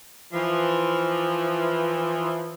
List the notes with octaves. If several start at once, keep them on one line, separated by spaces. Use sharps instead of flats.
E3 F3